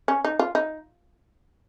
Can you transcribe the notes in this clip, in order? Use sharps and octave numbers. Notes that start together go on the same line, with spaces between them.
C#4
D#4
F4
D#4